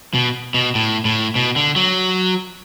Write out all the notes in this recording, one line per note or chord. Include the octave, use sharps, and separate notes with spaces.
B2
B2
A2
A2
B2
D3
F#3